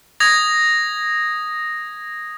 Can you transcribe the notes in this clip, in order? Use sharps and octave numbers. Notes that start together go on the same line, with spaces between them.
D#6 G#6 A#6